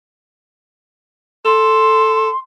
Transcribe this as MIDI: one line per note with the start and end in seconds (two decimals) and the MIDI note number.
1.45 2.29 69
1.45 2.38 84